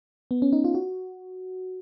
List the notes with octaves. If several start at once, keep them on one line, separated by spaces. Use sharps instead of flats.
B3
C#4
D#4
F4
F#4